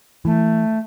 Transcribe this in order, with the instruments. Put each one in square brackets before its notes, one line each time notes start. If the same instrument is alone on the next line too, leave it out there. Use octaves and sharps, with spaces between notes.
[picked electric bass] E3 [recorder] A3